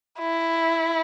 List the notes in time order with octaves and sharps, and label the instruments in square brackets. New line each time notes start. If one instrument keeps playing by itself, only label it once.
[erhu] E4